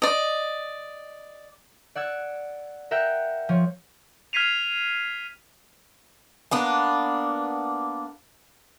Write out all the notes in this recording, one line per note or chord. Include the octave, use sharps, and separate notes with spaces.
D5 D#5
D5 F#5 E6 G#6
A#4 E5 F#5 G5
F3 C#5
F6 G#6 B6 C7 D#7 F7
A#3 B3 D4